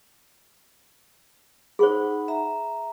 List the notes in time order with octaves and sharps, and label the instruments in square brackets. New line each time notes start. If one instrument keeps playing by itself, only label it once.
[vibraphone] D#4 F#5 B5 [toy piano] G#4 C5
[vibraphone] E5 A#5